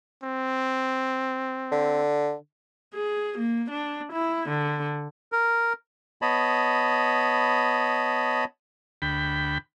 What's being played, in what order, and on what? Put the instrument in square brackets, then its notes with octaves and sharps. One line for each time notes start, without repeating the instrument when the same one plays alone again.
[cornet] C4
[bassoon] D3
[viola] G#4
A#3
D4
E4
D3
[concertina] A#4
[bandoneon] B3 C#5 D#5 A5 B5
[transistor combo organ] D2 G5 B5